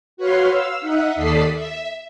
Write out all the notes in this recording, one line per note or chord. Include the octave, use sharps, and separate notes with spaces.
F#4 B4 C#5 F5 C6
F5 E6
D#4 E5 F#5
D#2 A4 D5 D#6 B6 C7
E5